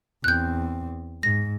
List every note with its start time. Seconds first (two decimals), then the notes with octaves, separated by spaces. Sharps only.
0.24 E2 C4 F#6 G6
1.23 G#2 A#6